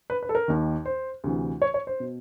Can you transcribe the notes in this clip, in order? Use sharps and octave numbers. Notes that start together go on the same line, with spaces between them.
B4
B4
A4
A#4
D#2 D#3
C5
D2 C3 E3
C#5
C#5
C5
B2